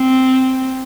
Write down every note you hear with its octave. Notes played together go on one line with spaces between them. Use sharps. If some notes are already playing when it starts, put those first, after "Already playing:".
Already playing: C4